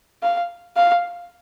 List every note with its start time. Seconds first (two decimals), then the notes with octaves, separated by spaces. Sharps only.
0.23 F5
0.77 F5